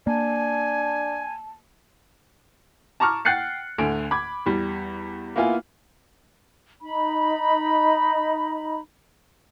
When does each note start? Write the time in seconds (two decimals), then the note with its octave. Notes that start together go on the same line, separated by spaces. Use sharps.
0.07 A#3 D4 G#5 A5
3.00 A5 A#5 C#6 D6 F6
3.25 F#5 G5 F#6 A6 C7 C#7
3.78 D2 D3 G#5 D7
4.11 B5 D6 G#6
4.46 E2 G3
5.36 A#3 B3 E4 F4 G#5
6.81 D#4 B5